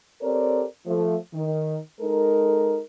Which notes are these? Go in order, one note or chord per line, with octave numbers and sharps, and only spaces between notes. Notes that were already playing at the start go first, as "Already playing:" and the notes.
C4 G4 A4 A#4 C#5 D5
F3 A3
D#3
G#3 D#4 A4 A#4